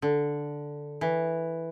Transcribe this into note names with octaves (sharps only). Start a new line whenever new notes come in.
D3
E3